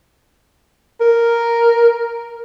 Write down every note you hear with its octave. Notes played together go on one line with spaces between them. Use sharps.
A#4